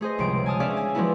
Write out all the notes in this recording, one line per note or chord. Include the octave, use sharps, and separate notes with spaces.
A3 G#4 C5 D#5
G1 C#2 C3 F3 D7
G#5 A5 D#6 F6
C#4 D4 G#4 D5 E5 F5
G#5
F3 F#3 G#3 B3 D4 E4